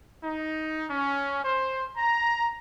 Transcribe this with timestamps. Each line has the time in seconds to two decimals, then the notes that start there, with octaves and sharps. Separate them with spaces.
0.23 D#4
0.90 C#4
1.43 C5
1.97 A#5